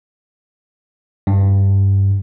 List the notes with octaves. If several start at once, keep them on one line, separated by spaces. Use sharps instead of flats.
G2